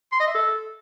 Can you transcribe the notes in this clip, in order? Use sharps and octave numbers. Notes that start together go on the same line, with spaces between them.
C6
D#5
E5
A4